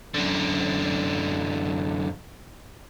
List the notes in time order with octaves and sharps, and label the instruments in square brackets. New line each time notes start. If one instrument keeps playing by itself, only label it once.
[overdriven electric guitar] F#2 D3